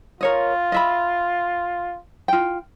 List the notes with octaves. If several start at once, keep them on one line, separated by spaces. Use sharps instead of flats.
F4 A#4 C#5 D#5
D#5 E5 B5
F4 G5